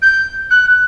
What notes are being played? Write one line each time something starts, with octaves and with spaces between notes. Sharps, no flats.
G6
F#6